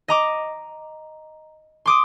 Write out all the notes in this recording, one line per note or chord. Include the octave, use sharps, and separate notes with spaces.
D#5 A#5 D6
C6 D6 D#6